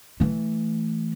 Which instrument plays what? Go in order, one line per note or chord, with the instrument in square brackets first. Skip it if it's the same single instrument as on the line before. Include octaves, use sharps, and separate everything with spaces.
[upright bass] E3 A3